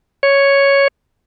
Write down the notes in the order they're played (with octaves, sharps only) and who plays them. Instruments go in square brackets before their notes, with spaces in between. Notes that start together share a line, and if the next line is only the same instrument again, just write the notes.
[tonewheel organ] C#5